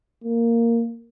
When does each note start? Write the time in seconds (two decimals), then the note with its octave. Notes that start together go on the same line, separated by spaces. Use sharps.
0.24 A#3